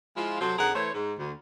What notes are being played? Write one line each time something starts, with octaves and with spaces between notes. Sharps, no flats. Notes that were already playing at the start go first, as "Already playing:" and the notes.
F3 G#3 E4 F4
C3 F#3 C4 A4 C5
F2 D3 D#4 G#4 A#4 F#5
E3 A3 C5 C#5
G#2
D2